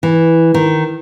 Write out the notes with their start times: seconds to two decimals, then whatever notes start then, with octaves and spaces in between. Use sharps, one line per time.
0.03 E3
0.54 D#3